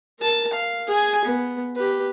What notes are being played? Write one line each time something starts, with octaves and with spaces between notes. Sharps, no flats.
A#4 A5
F5
G#4 G#5
B3
G4 B4